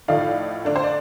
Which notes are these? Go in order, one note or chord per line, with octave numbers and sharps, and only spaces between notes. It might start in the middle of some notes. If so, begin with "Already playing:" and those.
A2 F3 A3 D#4 D5 F5
D3 A3 D4
C5
D5